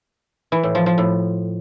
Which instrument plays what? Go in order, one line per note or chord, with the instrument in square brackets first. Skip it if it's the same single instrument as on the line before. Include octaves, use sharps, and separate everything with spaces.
[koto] E3
A2
F3
F3
A2